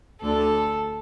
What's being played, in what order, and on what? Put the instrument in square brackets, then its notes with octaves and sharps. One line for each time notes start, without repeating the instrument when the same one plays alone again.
[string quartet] D2 D3 A4